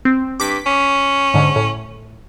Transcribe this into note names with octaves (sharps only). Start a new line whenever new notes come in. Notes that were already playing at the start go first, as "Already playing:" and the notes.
C4
G2 D6 B6
C#4
G#2 D3
A2